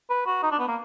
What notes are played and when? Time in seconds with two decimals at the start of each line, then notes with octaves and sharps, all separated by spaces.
0.10 B4
0.27 F#4
0.43 D#4
0.52 D4
0.60 B3
0.68 A#3